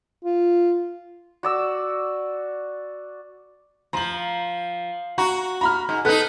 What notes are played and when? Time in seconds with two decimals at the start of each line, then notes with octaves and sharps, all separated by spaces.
0.24 F4
1.43 F#4 D5 E6
3.93 F3 A#5 F#7
5.18 F#4 A#5
5.61 A#5 B5 F6
5.89 G#2
6.05 B3 D#4 A4 F#6